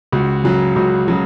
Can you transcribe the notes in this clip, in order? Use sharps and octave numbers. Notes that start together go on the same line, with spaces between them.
C#2 F#4
C#3 F#3
C#2 F#4
C#3 F#3